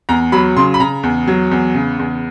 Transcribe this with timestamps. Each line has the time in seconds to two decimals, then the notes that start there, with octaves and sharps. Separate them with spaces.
0.09 E2 A#5
0.32 F#3 B5
0.56 C#3 C6
0.74 B5
0.80 C#3 A#5
1.03 E2
1.27 F#3
1.51 E2
1.75 C#3
1.99 E2